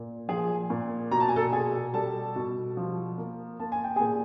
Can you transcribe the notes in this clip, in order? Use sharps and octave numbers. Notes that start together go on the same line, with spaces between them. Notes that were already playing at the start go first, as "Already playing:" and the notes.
Already playing: A#2
F3 G#4 G#5
A#2
B2 A#5
A5
G#5
A4 A5
B2 G#4 G#5
G3 A4 A5
B2
F3
A#3
A#3 A5
G#5
G5
A#2 G#4 G#5